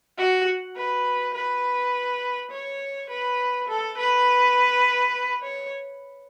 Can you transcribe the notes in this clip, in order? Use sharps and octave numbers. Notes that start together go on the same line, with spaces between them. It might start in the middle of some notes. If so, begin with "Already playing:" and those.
F#4
B4
B4
C#5
B4
A4
B4
C#5